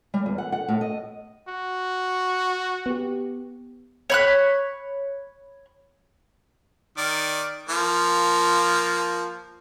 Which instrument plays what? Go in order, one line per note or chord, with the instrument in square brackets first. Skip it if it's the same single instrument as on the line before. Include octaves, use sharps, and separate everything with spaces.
[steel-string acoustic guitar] G3
E2
F#5
F#5
A2
D#5
[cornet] F#4
[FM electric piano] B3 G4
[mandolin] C#5 B5 F#6
[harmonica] D#3 D5
F3 A#3